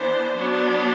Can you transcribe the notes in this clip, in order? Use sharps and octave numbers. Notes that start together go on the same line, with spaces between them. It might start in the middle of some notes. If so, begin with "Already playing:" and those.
Already playing: E3 B3 D4 C5
F#3 B3 D4